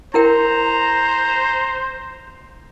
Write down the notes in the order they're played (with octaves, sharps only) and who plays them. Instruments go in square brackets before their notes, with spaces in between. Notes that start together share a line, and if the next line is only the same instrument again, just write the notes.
[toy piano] E4 A#4 G5 [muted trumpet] C5 [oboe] A#5